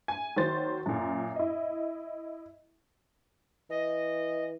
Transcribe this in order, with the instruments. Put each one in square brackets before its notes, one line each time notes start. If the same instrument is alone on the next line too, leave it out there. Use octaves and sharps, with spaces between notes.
[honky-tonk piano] G#5
D#3 F#3 C5 A6
F#2 A#2
E4 D#5
[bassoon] E3 [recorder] D#5